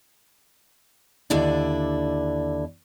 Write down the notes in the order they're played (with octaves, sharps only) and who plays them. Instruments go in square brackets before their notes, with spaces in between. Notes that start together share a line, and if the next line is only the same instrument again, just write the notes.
[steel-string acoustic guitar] D#2 D3 D4 E4 D5